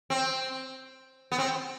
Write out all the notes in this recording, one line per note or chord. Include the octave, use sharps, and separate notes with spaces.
C4
B3
C4